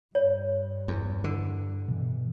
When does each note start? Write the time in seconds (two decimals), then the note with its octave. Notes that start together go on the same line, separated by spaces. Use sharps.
0.15 G2 C#5
0.88 E2
1.24 D3
1.88 B2 E3